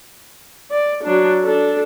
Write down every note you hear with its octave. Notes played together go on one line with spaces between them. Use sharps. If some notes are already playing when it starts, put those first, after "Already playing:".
D5
F#3 D4
D4 A4